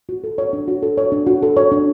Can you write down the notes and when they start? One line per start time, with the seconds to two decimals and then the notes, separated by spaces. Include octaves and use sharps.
0.09 F#4
0.24 A4
0.38 C#5
0.53 D4
0.68 F#4
0.83 A4
0.98 C#5
1.12 D4
1.27 F#4
1.43 A4
1.57 C#5
1.72 D4